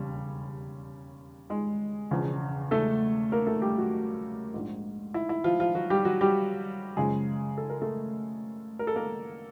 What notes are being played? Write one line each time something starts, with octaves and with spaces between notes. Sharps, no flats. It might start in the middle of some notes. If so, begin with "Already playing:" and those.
Already playing: E1 D#2 C#3 G3
G#3 G#4
E1 E2 C#3 F3
A3 A4
A#3 A#4
A3 A4
G3 G4
F#3 F#4
A#1 G#2 F3
E4
E4
F3 F4
F3 F4
F#3 F#4
G3 G4
F#3 F#4
G3 G4
F#1 F#2 C#3 F3 G#3 G#4
A4
A#4
A3 A4
A#4
A4
A#3 A#4